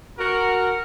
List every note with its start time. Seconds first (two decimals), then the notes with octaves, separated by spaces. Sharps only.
0.19 F#4 A#4